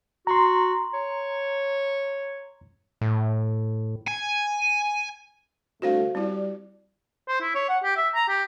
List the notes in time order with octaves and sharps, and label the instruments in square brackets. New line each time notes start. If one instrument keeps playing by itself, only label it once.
[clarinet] F#4 [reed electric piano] A#5 C6
[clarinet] C#5
[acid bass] A2
[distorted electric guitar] G#5
[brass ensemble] C2 D3 A3 [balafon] F#4 C5 F5
[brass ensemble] G3 D5 [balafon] C4 E4
[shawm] C5
E4
C#5
F#5
G4
E5
A#5
G4